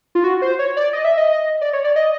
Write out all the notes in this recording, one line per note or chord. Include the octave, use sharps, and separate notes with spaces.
F4
F#4
C5
C#5
D5
D#5
E5
D#5
D5
C#5
D5
D#5